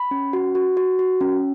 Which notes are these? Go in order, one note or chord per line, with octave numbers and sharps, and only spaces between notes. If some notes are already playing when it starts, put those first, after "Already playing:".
Already playing: B5
C#4
F#4
F#4
F#4
F#4
C#4